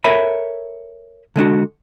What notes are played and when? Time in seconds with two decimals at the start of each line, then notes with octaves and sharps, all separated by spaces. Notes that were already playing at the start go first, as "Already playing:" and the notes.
0.04 A4 A#4 C#5 E5 G#5 B5
1.36 D3 G#3 D4 F#4